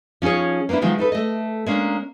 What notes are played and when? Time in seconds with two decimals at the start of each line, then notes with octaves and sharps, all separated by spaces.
0.22 F3 C#4 D#4 G#4 C#5
0.69 A#3 B3 C#4 D4 E4
0.81 D#3 F3 F#3 G#3
0.98 D#4 A4 B4
1.12 A3 D#5
1.66 G#3 A#3 C#4 D4